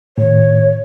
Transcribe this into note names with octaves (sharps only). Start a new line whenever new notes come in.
A2 D#3 C#5